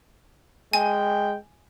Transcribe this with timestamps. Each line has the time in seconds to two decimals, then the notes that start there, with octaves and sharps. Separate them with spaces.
0.73 G#3 G5 G#5